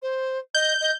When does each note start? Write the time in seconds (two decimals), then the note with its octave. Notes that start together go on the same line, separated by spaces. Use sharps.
0.02 C5
0.55 D#5 G6
0.81 D#5